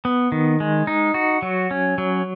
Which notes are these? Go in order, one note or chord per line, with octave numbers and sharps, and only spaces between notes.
B3
D#3
G#3
D#4
F#4
F#3
C#4
F#3